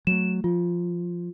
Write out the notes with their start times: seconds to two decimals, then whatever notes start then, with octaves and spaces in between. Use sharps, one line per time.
0.07 F#3 A3 E7
0.44 F3 F4